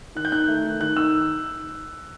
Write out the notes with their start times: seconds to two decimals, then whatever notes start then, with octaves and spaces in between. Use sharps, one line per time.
0.15 D#3 F#6
0.25 G6
0.32 D#4 F#6
0.48 A3
0.64 D#3
0.80 D#3 F#6
0.97 D#4 E6